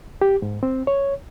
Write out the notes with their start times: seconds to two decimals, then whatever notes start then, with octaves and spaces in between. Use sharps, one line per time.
0.21 G4
0.42 G#2
0.63 C4
0.87 C#5